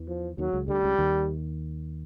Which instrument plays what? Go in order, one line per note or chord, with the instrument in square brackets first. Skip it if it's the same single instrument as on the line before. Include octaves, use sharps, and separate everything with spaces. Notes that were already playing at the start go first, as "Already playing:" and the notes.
Already playing: [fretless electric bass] E2 E3
[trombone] F3
[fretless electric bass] D#2 D#3 [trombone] F#3
[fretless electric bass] C#2 C#3
[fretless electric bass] D2 D3 [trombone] G3
[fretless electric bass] C#2 C#3
D#2 D#3